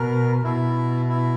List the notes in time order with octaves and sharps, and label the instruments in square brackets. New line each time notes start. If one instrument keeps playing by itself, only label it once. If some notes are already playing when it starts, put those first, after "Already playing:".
Already playing: [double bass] B2 [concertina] A#4
[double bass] B2 [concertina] E4
[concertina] E4